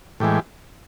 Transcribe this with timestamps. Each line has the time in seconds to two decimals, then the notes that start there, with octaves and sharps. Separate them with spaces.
0.20 A2 E3 G#3 G4